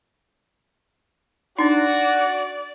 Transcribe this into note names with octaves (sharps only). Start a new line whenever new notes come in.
D4 D#4 F#4 D5